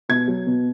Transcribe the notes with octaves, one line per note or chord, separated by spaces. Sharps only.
B2 G#6
F#3
B2